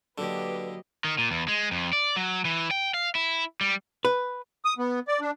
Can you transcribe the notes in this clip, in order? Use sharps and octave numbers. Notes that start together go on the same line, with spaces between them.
D3 F#3 A#3 G4 B4 D#5
D#3
A#2
E2
G#3
F2
D5
F#3
E3
G5
F5
E4
G3
B4
D#6
B3
D5
D4